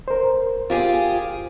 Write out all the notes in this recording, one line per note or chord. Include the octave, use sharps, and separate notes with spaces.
A#4 C5
F4 G4 G#4